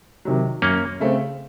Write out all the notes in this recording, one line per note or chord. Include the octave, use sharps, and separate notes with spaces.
C3 D#3 F#3
F#2 A#3 C#4
C#3 A3 C4